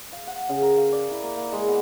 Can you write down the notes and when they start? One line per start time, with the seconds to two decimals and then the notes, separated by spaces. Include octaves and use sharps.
0.13 F5
0.27 F#5
0.49 C#3
0.62 A#4
0.78 F5
0.92 D5
1.11 E4
1.23 A#3
1.37 A#3
1.52 G#3
1.68 B3